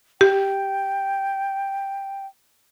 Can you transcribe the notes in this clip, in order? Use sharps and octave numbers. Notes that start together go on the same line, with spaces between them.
G4 G5